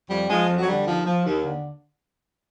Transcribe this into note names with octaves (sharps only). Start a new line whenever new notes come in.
F2 G3
F3 G#3
F2
F#3
D3 G3
D#2 F3
F3
D#2
D3